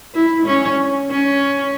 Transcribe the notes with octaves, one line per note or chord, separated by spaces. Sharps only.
E4
C#4
C#4